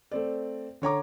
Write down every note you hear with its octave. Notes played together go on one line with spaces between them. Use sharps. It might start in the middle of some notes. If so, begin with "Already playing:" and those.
A3 C4 D5
D3 C#5 A#5 D6